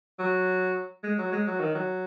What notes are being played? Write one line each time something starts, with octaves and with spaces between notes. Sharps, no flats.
F#3
G#3
F#3
G#3
F#3
D#3
F#3